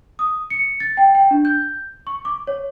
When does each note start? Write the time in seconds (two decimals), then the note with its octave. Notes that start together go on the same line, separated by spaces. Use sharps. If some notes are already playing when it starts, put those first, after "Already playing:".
0.19 D#6
0.50 C#7
0.80 A6
0.97 G5
1.15 G5
1.31 D4
1.45 G6
2.07 C#6
2.25 D6
2.47 C#5